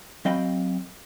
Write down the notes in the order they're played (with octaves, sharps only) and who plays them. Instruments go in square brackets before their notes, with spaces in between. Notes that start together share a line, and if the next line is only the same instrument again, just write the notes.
[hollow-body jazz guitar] F#3 C4 D#5 F5 G5 B5